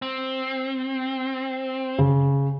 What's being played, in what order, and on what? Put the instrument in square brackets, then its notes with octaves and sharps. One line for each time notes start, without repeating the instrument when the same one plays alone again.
[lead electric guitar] C4
[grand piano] C#3